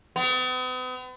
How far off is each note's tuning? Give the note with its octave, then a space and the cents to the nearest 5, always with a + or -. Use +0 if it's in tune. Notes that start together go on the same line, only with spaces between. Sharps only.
B3 +45